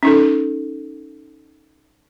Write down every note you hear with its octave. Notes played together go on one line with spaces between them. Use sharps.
C#4 D#4 A4